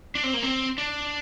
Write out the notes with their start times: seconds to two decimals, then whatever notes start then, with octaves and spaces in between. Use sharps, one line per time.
0.15 D4
0.24 C4
0.34 A#3
0.43 C4
0.78 D4